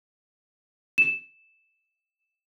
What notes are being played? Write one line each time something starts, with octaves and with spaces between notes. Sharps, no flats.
E7